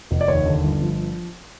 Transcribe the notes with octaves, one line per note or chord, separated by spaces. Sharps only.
F1
D5
D#2 C#5
D3
G1
F3